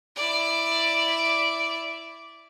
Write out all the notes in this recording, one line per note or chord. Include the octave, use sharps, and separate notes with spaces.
E4 D5